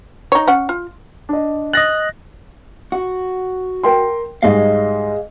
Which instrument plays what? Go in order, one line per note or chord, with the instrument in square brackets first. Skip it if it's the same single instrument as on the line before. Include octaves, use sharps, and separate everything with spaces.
[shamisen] D#4 C#5
C#4 F#5
F4
[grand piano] D4 D#5
[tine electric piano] D#5 F#6 [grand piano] A6 A#6
[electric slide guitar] F#4
[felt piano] A#4 G5 C6
[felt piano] G#2 G3 [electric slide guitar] G#4 D#5 F5